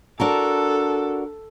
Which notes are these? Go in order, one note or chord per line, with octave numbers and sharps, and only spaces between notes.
D4 F#4 A4 A#4